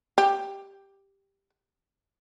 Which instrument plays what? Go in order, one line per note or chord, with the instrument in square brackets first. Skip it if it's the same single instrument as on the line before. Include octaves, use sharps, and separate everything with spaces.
[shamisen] G4